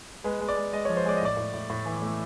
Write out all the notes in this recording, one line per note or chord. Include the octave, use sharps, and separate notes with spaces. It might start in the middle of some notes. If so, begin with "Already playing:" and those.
G#3 B4
G#3
D5
G#3
G#3 D#5
C#5
F3
C5
G#3 D5
D#5
A2 D5
A2
A2
A2
E3
A3